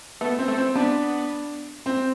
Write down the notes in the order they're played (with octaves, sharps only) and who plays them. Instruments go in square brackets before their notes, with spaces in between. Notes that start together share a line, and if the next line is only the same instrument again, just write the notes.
[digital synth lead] A3 [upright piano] B3
[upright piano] C4
[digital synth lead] A3
[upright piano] C4
[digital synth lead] B3 [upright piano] D4
[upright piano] C4